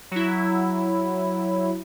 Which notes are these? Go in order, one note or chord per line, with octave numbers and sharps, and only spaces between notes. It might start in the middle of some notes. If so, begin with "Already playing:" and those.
F#3 E4